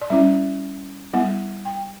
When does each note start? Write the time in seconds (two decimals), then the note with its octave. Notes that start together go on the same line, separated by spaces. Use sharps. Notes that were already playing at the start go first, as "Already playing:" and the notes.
0.01 D5
0.10 G3 C#4 E4 E5
1.13 G3 B3 E4 F#5
1.65 G5